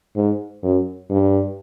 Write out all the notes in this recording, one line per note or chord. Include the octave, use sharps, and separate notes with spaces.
G#2
F#2
G2